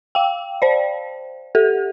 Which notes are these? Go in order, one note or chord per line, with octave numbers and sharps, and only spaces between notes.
F5 G5
C5 D5
G4 A4